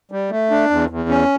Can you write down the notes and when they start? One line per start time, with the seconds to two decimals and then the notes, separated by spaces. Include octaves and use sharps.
0.12 G3
0.31 A3
0.50 D4
0.70 E2
0.90 E2
1.09 C#4